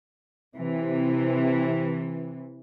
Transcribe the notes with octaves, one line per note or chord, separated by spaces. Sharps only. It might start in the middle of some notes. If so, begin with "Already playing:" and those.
C3 E3